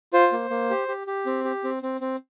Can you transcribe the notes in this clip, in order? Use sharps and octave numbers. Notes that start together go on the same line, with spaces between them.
F4 C5
A#3
A#3
G4
G4
G4
C4
G4
C4
C4
C4